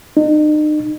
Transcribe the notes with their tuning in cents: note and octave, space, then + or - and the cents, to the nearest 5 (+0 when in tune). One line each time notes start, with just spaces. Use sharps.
D#4 -40